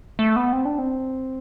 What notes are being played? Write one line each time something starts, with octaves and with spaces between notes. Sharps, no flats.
A3
B3
C4
D4
C4